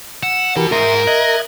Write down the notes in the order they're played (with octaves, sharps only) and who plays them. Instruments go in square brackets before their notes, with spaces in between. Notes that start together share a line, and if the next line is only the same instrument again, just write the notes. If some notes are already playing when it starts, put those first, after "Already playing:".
[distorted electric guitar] F#5 [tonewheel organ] E6
[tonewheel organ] E3 G4 A#4 [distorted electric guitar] F#4 B4
[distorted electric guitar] G#2 [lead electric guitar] A#4 [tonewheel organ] E5 C6 D#6
[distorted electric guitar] D#5 [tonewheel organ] E5 F#6 G#6